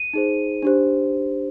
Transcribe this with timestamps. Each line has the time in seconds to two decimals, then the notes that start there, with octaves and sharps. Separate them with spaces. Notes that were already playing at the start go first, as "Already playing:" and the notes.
Already playing: D#7
0.13 D#4 G#4 C5
0.62 D4 G4 C5